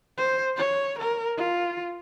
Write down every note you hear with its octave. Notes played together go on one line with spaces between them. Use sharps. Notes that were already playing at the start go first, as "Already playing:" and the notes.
C5
C#5
A#4
F4